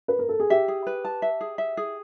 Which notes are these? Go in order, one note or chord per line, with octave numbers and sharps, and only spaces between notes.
B4
A#4
A4
G#4
G4 E5
G#4
B4
A5
E5
G#4
E5
G#4